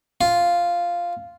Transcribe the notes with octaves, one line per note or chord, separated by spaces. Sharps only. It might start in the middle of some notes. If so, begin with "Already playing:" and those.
F4